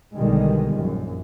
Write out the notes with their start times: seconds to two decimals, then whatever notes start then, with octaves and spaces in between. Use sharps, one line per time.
0.14 B1 B2 D3 D#3 G3 G#3
0.73 A#1 F#2